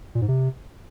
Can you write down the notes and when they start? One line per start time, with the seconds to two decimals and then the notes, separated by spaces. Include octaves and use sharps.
0.15 A#2
0.22 G#2
0.28 C3